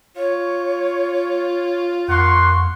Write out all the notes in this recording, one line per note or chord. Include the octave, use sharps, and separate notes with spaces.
F4 C#5
F2 A#3 F#5 C6 C#6